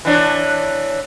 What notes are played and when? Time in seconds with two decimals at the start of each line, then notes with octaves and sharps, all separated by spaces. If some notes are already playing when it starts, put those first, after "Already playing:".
0.05 E3 D4 C#5